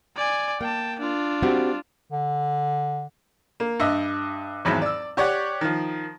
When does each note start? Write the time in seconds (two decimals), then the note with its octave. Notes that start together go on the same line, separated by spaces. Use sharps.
0.17 D5 G#5
0.61 A#3 G5 A5
1.00 D4 F4
1.42 G3 C4 F#4
2.12 D3
3.60 A#3
3.80 G2 D#5 E5
4.65 G#1 E2 G#2 F#3 B5
4.82 D5 E6
5.17 G4 C#5 D5 F#5
5.61 D#3 F3